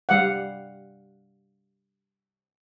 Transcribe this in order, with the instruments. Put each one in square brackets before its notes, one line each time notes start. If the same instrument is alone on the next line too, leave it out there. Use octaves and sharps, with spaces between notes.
[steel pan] G3 F5 F#5